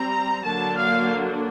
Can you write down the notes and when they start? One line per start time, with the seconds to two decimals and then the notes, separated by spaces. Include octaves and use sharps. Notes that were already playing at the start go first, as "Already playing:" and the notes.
Already playing: G3 C4 A#5
0.43 D3 F#3 A#3 D4 A5
0.76 F5